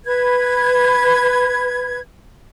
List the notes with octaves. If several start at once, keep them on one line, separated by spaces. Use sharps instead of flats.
B4 G#6